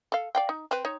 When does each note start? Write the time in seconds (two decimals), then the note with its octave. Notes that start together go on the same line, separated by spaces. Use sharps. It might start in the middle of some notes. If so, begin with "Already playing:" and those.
0.12 A4 F5
0.35 D5 F5 G5
0.49 D#4
0.71 C4 B4
0.85 D#4 C#5